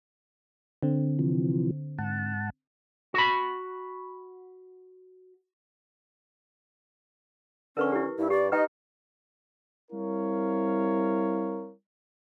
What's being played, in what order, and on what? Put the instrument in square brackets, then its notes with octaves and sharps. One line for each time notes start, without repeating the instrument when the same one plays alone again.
[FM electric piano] D3 C4
[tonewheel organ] C3 E3 F3
G#2 F#5 A5
[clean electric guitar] F#4 B5
[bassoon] D3 [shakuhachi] C#4 [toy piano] A#4 B4 C#6
[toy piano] E4 G4
[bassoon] G2 [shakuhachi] E4
[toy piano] G4 [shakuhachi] D5
[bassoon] D#4 [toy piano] B4 G5 [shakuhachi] D#5
[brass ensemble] G3 C4 E4 A#4 C#5 F5